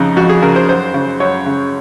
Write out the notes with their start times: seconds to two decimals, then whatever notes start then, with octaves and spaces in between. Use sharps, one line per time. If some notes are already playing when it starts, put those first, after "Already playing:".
Already playing: F2 C#3 D#4
0.16 F2 F#4
0.29 G#4
0.42 C#3 A#4
0.56 C5
0.68 F#2 C5
0.94 C#3
1.20 F#2 C#5
1.46 C#3